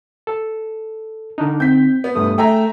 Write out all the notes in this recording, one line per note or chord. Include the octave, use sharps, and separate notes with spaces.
A4
D3 D4 D#4
C4 G6 B6
B3
G2 A3 D#6
A3 G#4 E5 G5 A#5